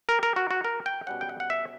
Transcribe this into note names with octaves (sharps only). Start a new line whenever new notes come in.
A#4
A#4
F#4
F#4
A#4
G5
B2 G3 C#4 F#5
G5
F#5
F#5
E5